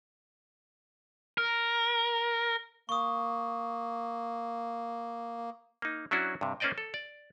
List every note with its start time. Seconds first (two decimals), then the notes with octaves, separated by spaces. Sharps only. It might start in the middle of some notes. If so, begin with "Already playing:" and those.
1.38 A#4
2.89 A#3 C#6 D#6
5.82 A#3 D#4
6.11 F#3 C#4 D4 E4 F#4
6.41 G2 C3
6.60 A#3 C#4 C5 D5 D#5 G5
6.78 A4
6.94 D5